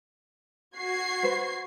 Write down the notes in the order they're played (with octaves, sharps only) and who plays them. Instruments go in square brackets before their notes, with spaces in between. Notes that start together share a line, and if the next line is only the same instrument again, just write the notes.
[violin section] F#4 G#6 C7
[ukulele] B4 C5